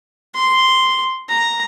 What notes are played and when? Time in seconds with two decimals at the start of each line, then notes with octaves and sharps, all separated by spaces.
0.34 C6
1.28 A#5